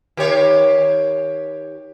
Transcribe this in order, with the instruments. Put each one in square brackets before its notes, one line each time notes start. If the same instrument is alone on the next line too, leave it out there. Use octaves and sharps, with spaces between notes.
[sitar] D#3 G4 C#5